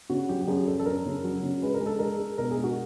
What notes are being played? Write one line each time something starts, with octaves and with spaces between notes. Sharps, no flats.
C#3 F#4
F#3 G4
G4
F#2 G#4
F#2 A4
A4
F#2 A#4
C#3
F#3
C#3
G#3 B4
A#4
G#3
A4
G#3 A#4
G#3
B2 A#4
G#4
G#3
F#4